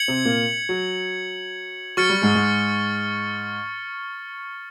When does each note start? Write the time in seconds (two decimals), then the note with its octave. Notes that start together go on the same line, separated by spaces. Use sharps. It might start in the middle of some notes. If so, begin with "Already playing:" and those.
Already playing: G#6 C#7 F#7
0.08 C3 C4
0.25 A#2 A#3
0.69 F#3
1.97 F#3 C#6 F6 A6 C#7
2.10 G3
2.22 G#2 G#3
2.35 G#2 G#3